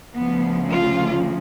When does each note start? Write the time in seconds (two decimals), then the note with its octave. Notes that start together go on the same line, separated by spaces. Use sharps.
0.15 D2 C#3 F3 B3
0.71 F4